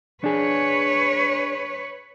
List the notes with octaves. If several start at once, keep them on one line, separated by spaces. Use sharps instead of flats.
D4 G#4 B4 C#5